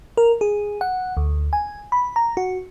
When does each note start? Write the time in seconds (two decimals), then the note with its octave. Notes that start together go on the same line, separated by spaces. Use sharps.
0.17 A#4
0.41 G#4
0.81 F#5
1.17 D2
1.53 G#5
1.92 B5
2.16 A#5
2.37 F#4